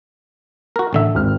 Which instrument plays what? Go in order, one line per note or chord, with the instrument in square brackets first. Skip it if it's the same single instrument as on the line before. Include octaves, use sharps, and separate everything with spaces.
[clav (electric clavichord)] F#4 A#4
A1 D3 E5
[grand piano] G#1 F6